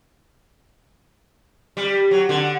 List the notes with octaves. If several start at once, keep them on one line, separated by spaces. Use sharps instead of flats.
G3
F#3
D3